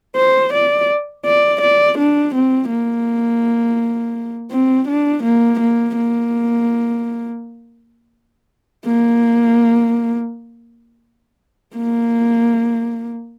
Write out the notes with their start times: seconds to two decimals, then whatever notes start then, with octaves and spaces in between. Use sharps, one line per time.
0.16 C5
0.53 D5
1.26 D5
1.61 D5
1.98 D4
2.35 C4
2.70 A#3
4.51 C4
4.88 D4
5.23 A#3
5.60 A#3
5.96 A#3
8.86 A#3
11.76 A#3